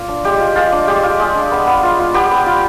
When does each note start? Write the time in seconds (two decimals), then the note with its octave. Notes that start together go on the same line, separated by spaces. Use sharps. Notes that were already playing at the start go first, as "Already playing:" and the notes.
Already playing: F4 D5
0.08 D4
0.24 G#3 G4
0.40 F4
0.56 G#3 F4
0.72 D4
0.87 G#3 G4
1.03 F4
1.19 G#3
1.35 D4
1.51 B3
1.67 B3
1.83 F4
1.99 F4
2.14 B3 G4
2.31 B3
2.46 F4